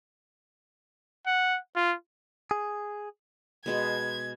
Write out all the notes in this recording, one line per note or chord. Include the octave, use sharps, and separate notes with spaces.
F#5
F4
G#4
B2 G#3 B3 G#6